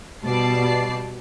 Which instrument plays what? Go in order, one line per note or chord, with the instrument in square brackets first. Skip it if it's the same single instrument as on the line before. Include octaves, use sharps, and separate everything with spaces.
[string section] B2 G3 D5 A5 C7